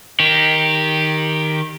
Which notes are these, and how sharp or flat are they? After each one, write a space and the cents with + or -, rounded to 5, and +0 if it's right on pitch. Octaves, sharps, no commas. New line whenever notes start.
D#3 +0 G4 +0